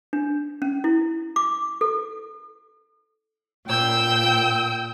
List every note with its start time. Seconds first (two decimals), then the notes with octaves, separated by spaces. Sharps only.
0.13 D4
0.62 C#4
0.84 E4
1.36 D6
1.81 A4
3.65 A#2 G5 E6 G6